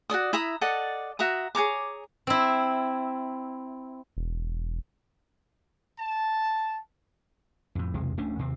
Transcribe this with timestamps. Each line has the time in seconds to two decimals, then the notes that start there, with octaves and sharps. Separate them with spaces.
0.10 F#4 A4 D5 D#6
0.33 E4 E5 A#5 D#6
0.61 A4 D5 D#5 F#5
1.19 F#4 E5 A#5 D#6
1.55 G#4 C#5 A#5 D6
2.27 C4 E4
4.17 E1
5.99 A5
7.75 F2 A2
7.94 B1 E2 C3 G#3
8.18 D1 A3 C#4 D4
8.39 D#2 C3 C4